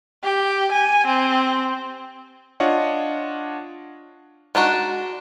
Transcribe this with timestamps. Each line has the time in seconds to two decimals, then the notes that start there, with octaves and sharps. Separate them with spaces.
0.23 G4
0.72 G#5
1.06 C4
2.60 D4 F4 C#5 D#5 F#5
4.55 G#3 D4 D#4 F#4